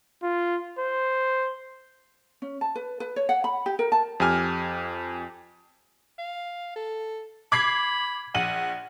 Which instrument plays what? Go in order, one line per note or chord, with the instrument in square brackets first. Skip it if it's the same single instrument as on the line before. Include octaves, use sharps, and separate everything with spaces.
[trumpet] F4
C5
[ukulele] C#4
A5
B4
B4
C#5
F#5
B5
G4
A#4
A5
[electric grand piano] F2 G4 G#5 F6
[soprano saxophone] F5
A4
[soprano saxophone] B5 [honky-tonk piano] D6 G#6 C7
[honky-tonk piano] A#1 D#7 F#7 [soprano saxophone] F#5